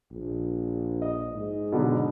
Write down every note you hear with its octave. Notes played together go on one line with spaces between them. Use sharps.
A#1
D#5
G#2
B2 D3 F#3